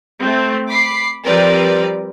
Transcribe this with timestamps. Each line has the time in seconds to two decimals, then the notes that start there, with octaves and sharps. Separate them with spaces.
0.19 A3 C4
0.69 B5 D6 C7
1.25 F3 G3 C4 A#4 B4 D5